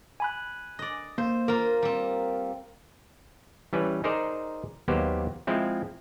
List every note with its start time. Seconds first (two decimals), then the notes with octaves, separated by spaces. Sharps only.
0.20 G#5 B5 F#6
0.79 D5 D#5
1.18 A#3 C5
1.48 A#3 F4 A#4
1.82 G3 C4
3.73 E3 G3 C#4 B4
4.04 D#4 G#4 A#4 C5 D5
4.88 D#2 F#3 A#3 B3 G4 C5
5.47 F3 G#3 C4 E4